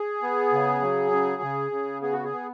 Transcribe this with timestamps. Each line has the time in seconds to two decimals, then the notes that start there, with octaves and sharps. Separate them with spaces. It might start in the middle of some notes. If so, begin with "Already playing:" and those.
Already playing: G#4
0.22 B3
0.52 C#3
0.82 F#3
1.11 C#3
1.42 C#3
1.71 C#3
2.02 B3 G#4
2.13 F#4
2.24 G#4
2.32 B3